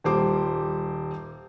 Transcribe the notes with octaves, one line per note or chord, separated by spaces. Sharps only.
D#1 G3 C5 D6